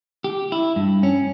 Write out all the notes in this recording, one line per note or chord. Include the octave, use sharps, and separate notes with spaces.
G4
E4
G2
C#4